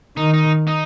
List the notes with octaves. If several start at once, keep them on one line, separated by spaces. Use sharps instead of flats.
D#3 D#4
D#4
D#4